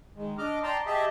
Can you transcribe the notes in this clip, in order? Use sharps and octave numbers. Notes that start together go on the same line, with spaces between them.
D#3 G#3
D4 D#5 D6 F6
D5 G5 A5 A#5 C6
G4 G#4 D#5 E5 A5